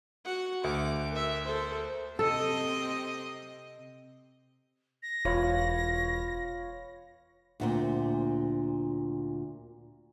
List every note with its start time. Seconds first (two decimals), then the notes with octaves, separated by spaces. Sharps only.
0.25 F#4 F#5
0.64 D2 D6
1.11 A#4 E5
1.45 A4 C5
2.19 C3 C4 A4 D#5
5.03 A#6
5.25 E1 F4 B4 C#5
7.60 D2 A#2 C4